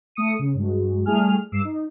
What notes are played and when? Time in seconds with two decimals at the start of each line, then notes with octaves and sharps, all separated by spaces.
0.15 A3 D#6 C#7 D#7
0.39 C#3
0.55 G2 F#3 G#3
1.06 G3 A3 E4 G#4 G#5 F6
1.52 G2 D6 E6 C7
1.64 D#4